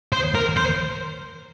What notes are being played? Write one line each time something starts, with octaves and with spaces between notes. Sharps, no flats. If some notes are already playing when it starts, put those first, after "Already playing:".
C5
A#4
C5